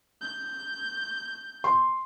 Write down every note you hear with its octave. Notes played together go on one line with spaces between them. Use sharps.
G6
C6